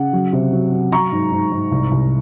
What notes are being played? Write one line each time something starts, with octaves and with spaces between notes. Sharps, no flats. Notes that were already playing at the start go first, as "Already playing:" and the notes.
Already playing: C#3 F#5
F#3
C3
F#3
F#3
F#3 A#5 C#6
G#2
G#2
G#2
C2
C2